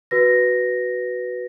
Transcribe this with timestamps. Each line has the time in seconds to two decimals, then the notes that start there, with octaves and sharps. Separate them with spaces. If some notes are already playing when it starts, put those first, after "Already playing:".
0.11 F#4 B4 A#6